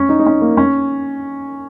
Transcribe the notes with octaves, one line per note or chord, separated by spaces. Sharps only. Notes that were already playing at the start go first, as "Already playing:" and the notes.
Already playing: C#4
D#4
D#4
C#4
A#3
C#4